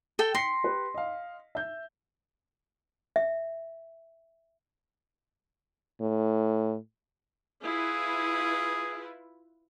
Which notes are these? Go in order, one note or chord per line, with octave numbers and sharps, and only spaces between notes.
A4 G5
C6 A#6 B6 C#7
G4 B4
D#5 F5
E5 G6
E5
A2
E4 F4 G#4 B4